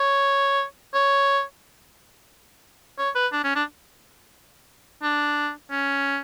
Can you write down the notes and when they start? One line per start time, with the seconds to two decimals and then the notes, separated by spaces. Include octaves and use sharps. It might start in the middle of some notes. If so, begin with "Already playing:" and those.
Already playing: C#5
0.94 C#5
2.98 C#5
3.15 B4
3.33 D4
3.44 C#4
3.55 D4
5.03 D4
5.71 C#4